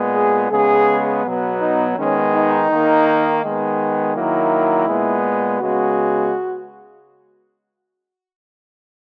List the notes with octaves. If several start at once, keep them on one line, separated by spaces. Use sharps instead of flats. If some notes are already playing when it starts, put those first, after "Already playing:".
Already playing: A#2 G#3 B3
G#4
C#3 G#3 B3 G#4
B2 F#3 B3
D#4
D#3 G#3 B3 C#4
D#4
D#3 A#3
D#3 G#3 B3
D#3 F#3 A#3 E4
A#2 G#3 B3
C#3 G#3 B3 F#4